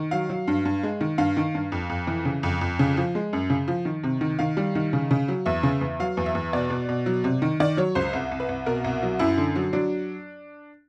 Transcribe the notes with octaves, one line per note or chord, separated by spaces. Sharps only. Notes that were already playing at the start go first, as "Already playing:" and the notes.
Already playing: D#3
F#3 F5
F#3
G2
G2
G#3
D#3
G2 F5
D#3
G2
F2
F2
E3
C#3
F2
F2
C#3
F3
G#3
F#2
C#3
F3
D#3
C3
D#3
D#3 F5
G3
D#3
C#3
C#3
F#3
E2 E5
C#3
E2
F#3 F5
E2
E5
E2
B2 D5
B2
B2
F#3
C3
D#3
D#3 D5
F#3 C#5
C#2 C5
C2
C2
B4
C2
B2 A#4
C2
F#3
F#2 E4
D3
F#3
F#3 D4